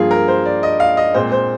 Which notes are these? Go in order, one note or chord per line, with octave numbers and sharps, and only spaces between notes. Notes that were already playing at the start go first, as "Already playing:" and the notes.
Already playing: G2 F3 A#3 F4 G#4
A#4
C5
D5
D#5
F5
D#5
A#2 G#3 C4 C5
C5